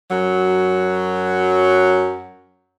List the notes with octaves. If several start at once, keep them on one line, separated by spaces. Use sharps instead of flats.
F#2 F#3